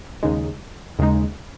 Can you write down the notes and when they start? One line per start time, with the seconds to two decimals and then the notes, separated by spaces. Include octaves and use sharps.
0.23 D#2 C#3 G#3 D#4
0.99 D#2 C#3 G#3 D#4